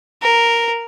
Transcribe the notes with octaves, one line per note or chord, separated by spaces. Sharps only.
A#4